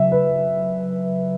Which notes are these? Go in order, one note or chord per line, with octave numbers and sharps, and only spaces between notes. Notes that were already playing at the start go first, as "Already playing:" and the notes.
Already playing: C#3 F#3 E5
B4